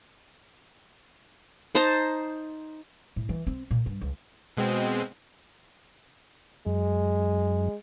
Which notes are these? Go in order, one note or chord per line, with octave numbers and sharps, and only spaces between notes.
D#4 C5 A5 A#5
A2
E3
C4
A#2
G2
C#2
B2 G#3 C4
F#2 G#3